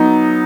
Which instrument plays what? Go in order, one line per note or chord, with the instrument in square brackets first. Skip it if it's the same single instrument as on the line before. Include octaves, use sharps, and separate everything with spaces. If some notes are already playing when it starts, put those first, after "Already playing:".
Already playing: [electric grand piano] F#3 B3 D#4